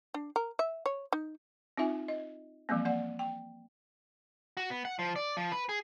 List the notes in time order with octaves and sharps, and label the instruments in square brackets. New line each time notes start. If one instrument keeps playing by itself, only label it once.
[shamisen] D4
A#4
E5
C#5
D#4
[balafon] C4 D#4 F4 E5 G#5
D#5
E3 F3 G3 A#3 C4
A#3 D5 F#5
G5
[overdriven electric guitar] F#4
B3
F#5
F3
D5
F3
B4
G#4